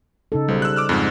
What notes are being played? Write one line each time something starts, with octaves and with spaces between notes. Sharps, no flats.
C#3 D#4 A4
B1 G3 C5
E6 F#6
D6 E6 F6
F2 G#2